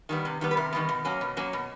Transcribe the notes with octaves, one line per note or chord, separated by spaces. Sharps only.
D#3 G3 B3
C3
D#3 G3 B3
B4
C3 A#4
D#3 G3 B3
B2
F#3 A#3 C#4
B2
F#3 A#3 C#4
B2